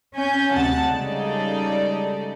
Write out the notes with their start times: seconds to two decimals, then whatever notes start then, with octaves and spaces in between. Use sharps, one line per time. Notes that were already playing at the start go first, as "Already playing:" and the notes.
0.15 C#4 G#5 G6
0.53 D2 C3 F#5 A5
0.89 C#3 G3 G#3 D#4 A4 D5